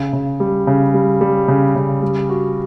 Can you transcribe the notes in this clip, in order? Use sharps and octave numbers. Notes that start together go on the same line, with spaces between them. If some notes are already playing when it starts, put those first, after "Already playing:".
Already playing: C#3
C#3
G3
C#3
G3
G3
C#3
C#3
G3
F#4